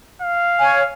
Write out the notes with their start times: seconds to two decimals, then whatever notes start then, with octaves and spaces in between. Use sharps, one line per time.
0.22 F5
0.59 C#5 G#5